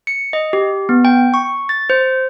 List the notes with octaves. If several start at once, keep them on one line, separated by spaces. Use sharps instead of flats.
C#7
D#5
G4
B3
G5
C#6
A6
C5